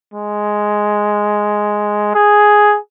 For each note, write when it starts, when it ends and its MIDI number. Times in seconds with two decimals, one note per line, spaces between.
0.14 2.14 56
2.15 2.78 68